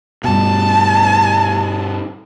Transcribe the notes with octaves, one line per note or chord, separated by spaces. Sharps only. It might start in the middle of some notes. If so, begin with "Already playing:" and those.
G2 B2 A5